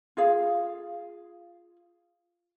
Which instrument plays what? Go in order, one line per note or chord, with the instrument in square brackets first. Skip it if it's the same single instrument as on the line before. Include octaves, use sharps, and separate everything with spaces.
[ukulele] F4 G#4 F5